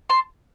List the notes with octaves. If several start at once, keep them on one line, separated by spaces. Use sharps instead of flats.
A5 C6